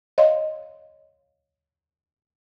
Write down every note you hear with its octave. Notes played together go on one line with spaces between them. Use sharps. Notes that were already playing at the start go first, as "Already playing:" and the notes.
C#5 D#5 F5 C6